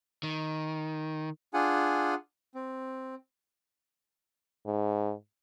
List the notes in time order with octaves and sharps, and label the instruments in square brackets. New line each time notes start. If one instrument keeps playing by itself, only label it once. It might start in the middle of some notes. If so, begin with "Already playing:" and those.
[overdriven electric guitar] D#3
[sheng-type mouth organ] D4 F4 G#4 F#5 G#5
C4
[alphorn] G#2